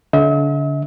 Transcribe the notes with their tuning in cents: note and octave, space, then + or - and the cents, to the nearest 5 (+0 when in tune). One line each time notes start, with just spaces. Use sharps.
D3 -35 E5 -45